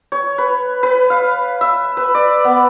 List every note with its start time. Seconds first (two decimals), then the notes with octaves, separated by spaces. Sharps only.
0.12 C#5
0.38 B4
0.83 B4
1.10 F5
1.61 E5
1.97 B4
2.15 D5
2.44 B3